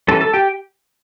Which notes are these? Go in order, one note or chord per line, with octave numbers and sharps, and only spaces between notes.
E3 G3 C#4 A4 A5
A4 A5
G4 G5